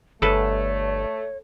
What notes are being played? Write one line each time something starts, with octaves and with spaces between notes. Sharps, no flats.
G1 A3 A4 B4 C#5